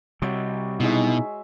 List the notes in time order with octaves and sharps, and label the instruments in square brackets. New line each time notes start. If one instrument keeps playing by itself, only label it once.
[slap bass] C3 G3 [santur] F#4 C#5 D#5
[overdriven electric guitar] B2 [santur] G#3 E5 [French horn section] D#4 E4